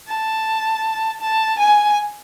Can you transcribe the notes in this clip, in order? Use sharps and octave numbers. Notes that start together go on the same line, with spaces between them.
A5
A5
G#5